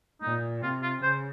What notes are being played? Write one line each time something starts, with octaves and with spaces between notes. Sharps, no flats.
A#2 D#4
C3 F4
F4
C#3 C5